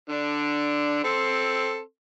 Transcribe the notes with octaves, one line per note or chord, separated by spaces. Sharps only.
D3 D4
C4 A4 C6